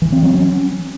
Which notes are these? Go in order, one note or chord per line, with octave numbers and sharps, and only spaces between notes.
E3
C4
F#3
C#4